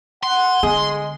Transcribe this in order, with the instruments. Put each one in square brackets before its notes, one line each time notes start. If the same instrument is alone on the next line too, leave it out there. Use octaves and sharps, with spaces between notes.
[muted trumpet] F#5 [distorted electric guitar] C6
[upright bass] D3 B3 [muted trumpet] G#3 [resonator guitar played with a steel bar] G#4